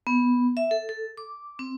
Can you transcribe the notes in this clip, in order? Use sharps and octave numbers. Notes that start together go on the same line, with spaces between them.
B3
E5
A4
A4
D6
C4